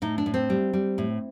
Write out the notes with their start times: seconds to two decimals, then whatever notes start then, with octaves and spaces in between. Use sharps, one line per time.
0.02 A2 D#4
0.18 D4
0.26 A2
0.34 C4
0.50 G3
0.73 G3
0.98 A2